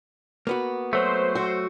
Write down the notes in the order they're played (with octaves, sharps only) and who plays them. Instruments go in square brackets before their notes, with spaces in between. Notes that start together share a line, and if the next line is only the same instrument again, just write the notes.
[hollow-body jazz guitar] A#3 B3 F#4
[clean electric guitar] F#3 A3 [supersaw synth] C5
[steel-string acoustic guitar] F#4